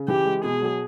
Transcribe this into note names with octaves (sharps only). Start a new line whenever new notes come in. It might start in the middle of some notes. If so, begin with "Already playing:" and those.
Already playing: C#3
E3 G4
G#3
B2 G#4
F#3